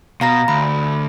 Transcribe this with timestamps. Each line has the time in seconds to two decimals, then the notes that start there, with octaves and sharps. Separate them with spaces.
0.21 B2 F5 A#5 A#6
0.48 D2 B5